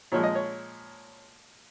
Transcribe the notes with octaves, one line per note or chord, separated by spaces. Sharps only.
A#2 F3 G#3 C#5
D#5
C#5